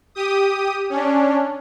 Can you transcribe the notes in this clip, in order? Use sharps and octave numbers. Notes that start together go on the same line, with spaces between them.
G4 D#6
C#4 D4